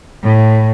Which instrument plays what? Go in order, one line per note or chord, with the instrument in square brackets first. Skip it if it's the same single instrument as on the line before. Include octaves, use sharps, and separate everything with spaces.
[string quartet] A2